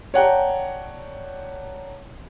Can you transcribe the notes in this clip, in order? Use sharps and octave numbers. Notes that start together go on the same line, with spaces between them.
C#5 D5 F#5 G5 A5 A#5